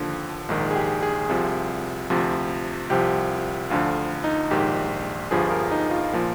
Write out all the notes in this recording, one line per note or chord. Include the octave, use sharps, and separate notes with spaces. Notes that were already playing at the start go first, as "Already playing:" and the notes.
Already playing: D#2 D3 F3
A#1 G#2 D#3
G#4
G4
G#4
C2 C3 F3
D2 C3 F3
C2 C3 F3 G4
D2 D3 F3 F4
D#4
A#1 G#2 D#3 G4
G1 G2 F3 G#4
A#4
D#4
F4
A#2 F3